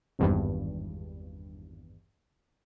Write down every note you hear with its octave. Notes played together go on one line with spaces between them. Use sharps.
G#1 E2 G2